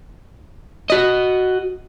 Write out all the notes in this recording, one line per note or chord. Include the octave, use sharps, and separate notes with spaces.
F#4 D#5